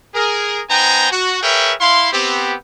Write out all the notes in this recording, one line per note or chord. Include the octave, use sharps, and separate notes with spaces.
G#4 A#4
B3 D#4 C5 G5 G#5 A#5
F#4
G#4 A#4 B4 C#5 E5 G5
E4 F5 C6
B3 C4 G4